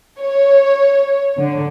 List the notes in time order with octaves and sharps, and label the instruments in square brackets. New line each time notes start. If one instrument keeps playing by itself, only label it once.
[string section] C#5
D3